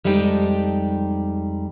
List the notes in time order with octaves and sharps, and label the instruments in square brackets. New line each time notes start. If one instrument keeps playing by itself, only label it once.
[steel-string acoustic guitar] F2 G3 G#3 D#4 G5 A5